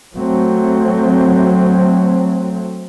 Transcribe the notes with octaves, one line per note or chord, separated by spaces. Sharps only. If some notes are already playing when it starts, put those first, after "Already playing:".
F#3 A3 C4